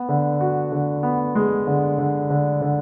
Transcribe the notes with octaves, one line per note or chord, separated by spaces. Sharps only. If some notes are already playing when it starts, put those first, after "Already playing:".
Already playing: B3
D3
F#4
D3
B3
G#3
D3
D3
D3
D3